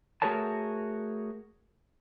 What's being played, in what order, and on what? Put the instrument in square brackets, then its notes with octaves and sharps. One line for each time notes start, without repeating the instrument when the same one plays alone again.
[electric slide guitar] A3 F#4 G#4 A#4 C#5 A5